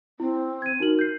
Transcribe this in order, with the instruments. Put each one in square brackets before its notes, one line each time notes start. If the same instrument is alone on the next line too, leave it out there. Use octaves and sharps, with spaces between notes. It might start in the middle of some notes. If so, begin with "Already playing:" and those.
[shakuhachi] C4 [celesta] E4
[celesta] G#6 D#7
[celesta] D#4 F#4 F#7 [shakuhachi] A#4
[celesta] G6 C7